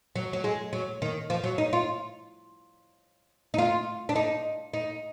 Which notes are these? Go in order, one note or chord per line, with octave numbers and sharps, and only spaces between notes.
F#3
F#3
G#3
F#3
D#3
F3
F#3
D#4
F4
D#4
F4
D4
D#4
D#4